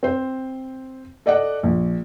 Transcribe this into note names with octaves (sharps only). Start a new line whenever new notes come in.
C4 C5
A4 D5 D#5 F#5
A#1